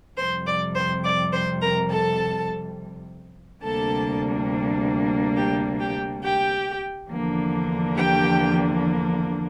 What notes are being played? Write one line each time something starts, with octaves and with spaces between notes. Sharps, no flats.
F2 C3 G3 C5 C6
D5 D6
C5 C6
D5 D6
C5 C6
A#4 A#5
A4 A5
D2 C3 G3 A#3 D4 A4 A5
G4 G5
G4 G5
G4 G5
E2 D3 F3 A#3 D4
G4 G5